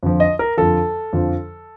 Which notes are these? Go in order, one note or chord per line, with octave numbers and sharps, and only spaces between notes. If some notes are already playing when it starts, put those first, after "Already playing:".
F2 D3 F3
D#5
A#4
F2 D3 F3 A4
F2 D3 F3